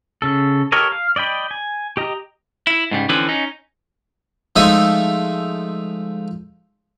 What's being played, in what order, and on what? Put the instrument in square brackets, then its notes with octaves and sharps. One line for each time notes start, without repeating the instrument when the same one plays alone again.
[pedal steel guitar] C#3 A4
G4 A4 A#4 C#5 D#5
F5
D5 D#5 G5 B5
G#5
G4 D#5 A#5
[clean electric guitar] E4
G#2 C#3 G3
D3 E3 F3 C4 C#4 B4
C#4 D#4
[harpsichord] F3 G#3 A3 D#4 E5 G#5